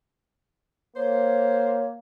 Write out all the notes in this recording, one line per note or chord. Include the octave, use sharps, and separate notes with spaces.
A#3 C5 C#5